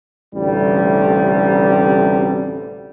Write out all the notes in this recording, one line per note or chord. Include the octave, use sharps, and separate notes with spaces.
A1 D2 C3 G3